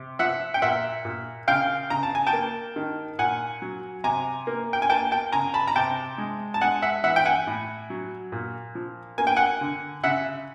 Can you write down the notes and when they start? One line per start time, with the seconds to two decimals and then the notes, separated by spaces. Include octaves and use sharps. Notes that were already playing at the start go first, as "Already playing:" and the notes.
Already playing: C3
0.19 F3 E5 F#5
0.54 G5
0.62 A#2 E5 F#5
1.05 A#2
1.48 C#3 F5 G5
1.90 C#3 A#5
2.03 A5
2.15 G#5
2.27 G5 A5
2.33 A#3
2.76 D#3
3.19 A#2 F#5 G#5
3.62 F#3
4.04 C3 G#5 A#5
4.47 A#3
4.73 G5
4.82 G#5
4.90 A#3 G5 A5
5.11 G5 A5
5.32 C#3 G#5 A#5
5.54 A5 B5
5.68 A#5
5.76 C3 G5 A5
6.18 G#3
6.54 A5
6.61 G#3 F#5 G#5
6.82 E5 F#5
7.04 E3 E5 F#5
7.16 G5
7.26 F#5 G#5
7.47 A2
7.90 F#3
8.32 A#2
8.75 F3
9.18 A#3 G#5
9.27 G5
9.36 F#5 G#5
9.61 D3
10.04 C#3 E5 F#5